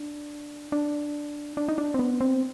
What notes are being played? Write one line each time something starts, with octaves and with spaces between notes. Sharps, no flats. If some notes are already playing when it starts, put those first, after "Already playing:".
Already playing: D4
D4
D4
D#4
D4
C4
B3
C4